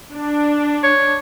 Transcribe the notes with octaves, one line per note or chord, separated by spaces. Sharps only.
D4
C#5